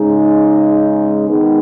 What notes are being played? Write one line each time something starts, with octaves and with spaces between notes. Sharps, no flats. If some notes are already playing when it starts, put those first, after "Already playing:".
Already playing: C#3 G#3 D#4
D#3 G#3 B3 D#4